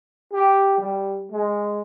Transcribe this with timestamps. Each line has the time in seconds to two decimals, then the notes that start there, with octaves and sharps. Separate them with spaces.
0.33 G4
0.78 G3
1.32 G#3